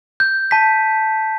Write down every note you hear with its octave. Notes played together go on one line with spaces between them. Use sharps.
G6
A5 B6